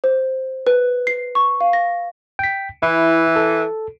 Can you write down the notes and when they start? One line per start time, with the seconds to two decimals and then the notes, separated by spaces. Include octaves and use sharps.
0.04 C5
0.67 B4
1.07 C7
1.35 C#6
1.61 F5
1.73 A#6
2.39 G5 B6
2.82 E3 E4
3.36 A4